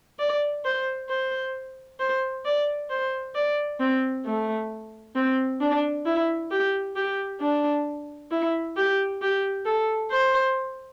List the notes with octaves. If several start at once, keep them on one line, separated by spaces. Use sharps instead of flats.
D5
C5
C5
C5
D5
C5
D5
C4
A3
C4
D4
E4
G4
G4
D4
E4
G4
G4
A4
C5